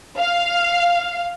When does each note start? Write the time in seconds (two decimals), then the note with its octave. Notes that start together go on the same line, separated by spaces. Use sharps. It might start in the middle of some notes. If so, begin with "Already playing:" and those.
0.18 F5